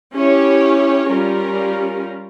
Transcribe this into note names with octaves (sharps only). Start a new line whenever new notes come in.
C#4 E4 G4 C#5
G3 C#4 F4 A#4